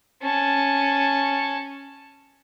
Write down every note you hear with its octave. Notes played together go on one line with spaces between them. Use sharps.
C#4 A5